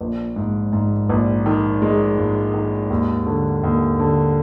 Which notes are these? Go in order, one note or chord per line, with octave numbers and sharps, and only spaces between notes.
A#1
G#2
G#2
A#1
D#3
G#3
G#2
D#3
D#2
D3
D#2
D3